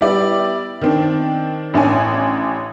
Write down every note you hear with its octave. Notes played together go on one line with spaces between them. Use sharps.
G3 B3 E4 D5
D#3 C4 D4
A1 D4 C#5 G#5